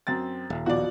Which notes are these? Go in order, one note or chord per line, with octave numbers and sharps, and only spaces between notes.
F#2 C4 A6
D#1
B2 F3 F#4 D5